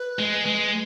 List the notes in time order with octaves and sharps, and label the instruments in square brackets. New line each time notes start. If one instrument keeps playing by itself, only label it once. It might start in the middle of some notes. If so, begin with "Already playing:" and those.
Already playing: [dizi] B4
[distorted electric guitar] G#3
G#3